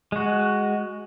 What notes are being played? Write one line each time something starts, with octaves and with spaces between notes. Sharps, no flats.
G#3 F#4